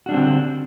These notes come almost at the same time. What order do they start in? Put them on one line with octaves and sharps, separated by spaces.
F#4 D4 G3 C4 D3